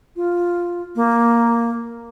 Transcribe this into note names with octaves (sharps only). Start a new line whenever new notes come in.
F4
A#3